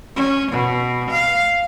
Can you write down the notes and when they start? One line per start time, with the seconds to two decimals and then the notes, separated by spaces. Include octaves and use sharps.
0.16 C#4
0.51 B2
1.10 F5